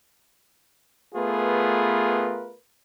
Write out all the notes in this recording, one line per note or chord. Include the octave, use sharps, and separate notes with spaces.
A3 B3 F4 G#4 A#4 B4